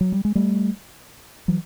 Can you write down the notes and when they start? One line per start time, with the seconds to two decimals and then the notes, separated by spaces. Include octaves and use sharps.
0.01 F#3
0.12 G3
0.25 G#3
0.35 G3 A3
1.48 E3 F#3